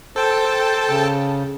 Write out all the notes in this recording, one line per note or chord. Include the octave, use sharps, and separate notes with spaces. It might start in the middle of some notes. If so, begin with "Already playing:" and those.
A4 C5 G5 A5
C#3